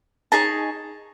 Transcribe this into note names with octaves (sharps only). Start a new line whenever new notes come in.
D#4 G#4 C#5 A5